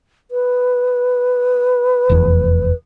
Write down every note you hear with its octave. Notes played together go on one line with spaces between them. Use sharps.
B4
F1 E2